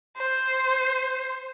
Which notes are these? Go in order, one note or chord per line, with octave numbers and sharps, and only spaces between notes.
C5